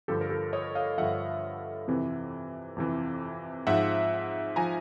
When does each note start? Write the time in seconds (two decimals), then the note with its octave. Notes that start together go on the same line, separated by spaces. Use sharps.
0.08 G2 D3 F3 G4 A4
0.21 A#4
0.30 G4 A4
0.53 C#5 D#5
0.75 D#5 F5
0.98 G2 D3 F3 E5 F#5
1.87 F2 C3 E3
2.77 F2 C3 E3
3.67 G#2 F3 E5 F#5
4.56 F3 G#5 A#5